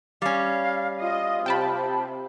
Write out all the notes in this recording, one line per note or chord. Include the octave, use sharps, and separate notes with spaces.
G3 C#4 F5
F4 D#5
C3 G5 A5 B5